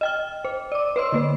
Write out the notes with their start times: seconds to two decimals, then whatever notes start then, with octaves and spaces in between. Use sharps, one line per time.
0.01 D#5 G5 F6
0.45 C5
0.72 D5 D6
0.96 B4 C#5 D#5 C6 E6
1.12 D3 A#3 B4